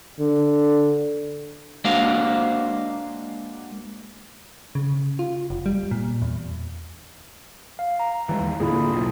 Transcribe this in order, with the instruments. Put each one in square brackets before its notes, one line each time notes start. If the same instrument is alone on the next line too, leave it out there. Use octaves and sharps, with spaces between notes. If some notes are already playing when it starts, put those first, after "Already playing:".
[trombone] D3
[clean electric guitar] G#3 A#3 D4 F#4 C5 F5
[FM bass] C#3
F4
F1
G3
A#2
E2
[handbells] F5
A#5
[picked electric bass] E3 G3 G#3
D#2
[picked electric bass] A2 D3 A#3 [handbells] E4 F4 G#4
[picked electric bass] E1 B1